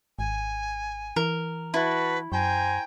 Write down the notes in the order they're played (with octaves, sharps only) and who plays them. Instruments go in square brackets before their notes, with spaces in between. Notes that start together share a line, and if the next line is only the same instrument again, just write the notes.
[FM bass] G#1 [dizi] G#5
[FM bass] E3 [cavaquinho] A#4
[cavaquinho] E4 [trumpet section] F#4 A5 [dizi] B4
[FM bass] F#2 [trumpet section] C5 G#5 A#5 [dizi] G5